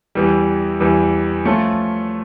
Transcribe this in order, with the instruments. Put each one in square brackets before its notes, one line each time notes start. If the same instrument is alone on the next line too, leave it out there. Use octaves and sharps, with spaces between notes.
[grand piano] E2 E3 G3
E2 E3 G3
F3 A3 C#4 F4 A4